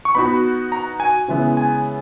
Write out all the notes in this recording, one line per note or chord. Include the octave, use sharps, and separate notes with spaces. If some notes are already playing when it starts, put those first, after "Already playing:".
C#6
B3 D#4 F#4 B5
A#5
G#5
C#3 E3 G#3 B3 E4
G#5